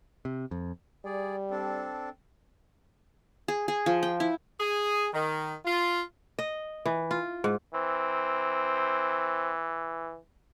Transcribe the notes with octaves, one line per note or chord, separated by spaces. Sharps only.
C3
F2
G3 G#4 D5
C4 D4 A4
G#4
G#4
F3
G5
E4
G#4
D#3
F4
D#5
E3
F4
G#2
E3 C4